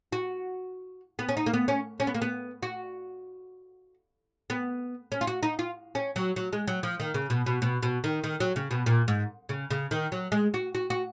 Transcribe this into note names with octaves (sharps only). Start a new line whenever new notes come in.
F#4
B3
C#4
D#4
A#3
B3
C#4
C#4
B3
A#3
B3
F#4
B3
C#4
F4
F#4
D#4
F4
C#4
F#3
F#3
G#3
F#3
F3
D#3
C#3
B2
B2
B2
B2
D#3
D#3
F#3
C#3
B2
A#2
G#2
C#3
C#3
D#3
F#3
G#3
F#4
F#4
F#4